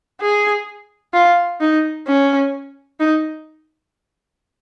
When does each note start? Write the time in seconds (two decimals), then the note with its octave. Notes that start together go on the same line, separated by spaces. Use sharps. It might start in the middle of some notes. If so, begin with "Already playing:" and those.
0.21 G#4
1.14 F4
1.61 D#4
2.07 C#4
3.00 D#4